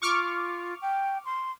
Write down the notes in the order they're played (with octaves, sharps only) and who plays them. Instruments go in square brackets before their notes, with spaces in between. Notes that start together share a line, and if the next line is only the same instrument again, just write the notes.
[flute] F4 [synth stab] C#6 D6 F6
[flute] G5
C6